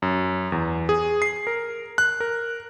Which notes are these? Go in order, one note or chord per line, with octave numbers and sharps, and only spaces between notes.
F#2
E2
G#4
C7
A#4
F#6
A#4